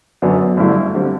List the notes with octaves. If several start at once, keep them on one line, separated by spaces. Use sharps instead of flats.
F#2 D3 F#3 B3 D4
G1 G2 D3 A3 E4
D3 G3 C4